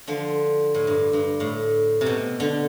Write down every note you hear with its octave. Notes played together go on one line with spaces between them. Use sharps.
D3 F3
A2
G2
G2
A2
C3
B2
D3